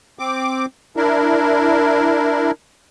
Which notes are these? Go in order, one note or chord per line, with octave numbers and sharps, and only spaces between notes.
C4 D6
D4 E4 A#4